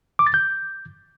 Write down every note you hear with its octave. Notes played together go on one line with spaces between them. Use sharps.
D6
A6
G6